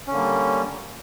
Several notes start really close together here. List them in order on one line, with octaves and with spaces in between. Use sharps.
C#4 D3 A#3 G3